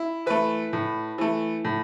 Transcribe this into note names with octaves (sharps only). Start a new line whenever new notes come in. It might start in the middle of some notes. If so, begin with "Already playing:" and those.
Already playing: E4
E3 A3 B4
A2
E3 A3
A2